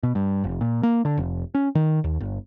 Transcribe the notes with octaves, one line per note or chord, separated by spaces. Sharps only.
B2
G2
F1
A#2
A#3
D3
F1
C#4
D#3
D#2
G1